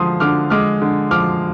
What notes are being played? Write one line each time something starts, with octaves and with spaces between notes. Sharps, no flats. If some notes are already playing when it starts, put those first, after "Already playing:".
Already playing: D3 F3 G#3 C6 D#6
D3 D6 F6
G#3 D6 F6
D3
F3 D6 F6